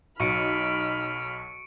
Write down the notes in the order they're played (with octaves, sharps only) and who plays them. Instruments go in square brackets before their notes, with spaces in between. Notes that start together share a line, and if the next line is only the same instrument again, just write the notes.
[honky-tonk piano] B1 [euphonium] D#4 [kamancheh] B5 F6 [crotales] C#6 C#7 D7